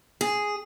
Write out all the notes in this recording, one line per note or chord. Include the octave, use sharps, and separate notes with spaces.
G#4